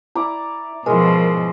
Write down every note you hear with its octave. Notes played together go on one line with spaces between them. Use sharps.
E4 D5 A#5
B2 F3 G#3 E4 A#4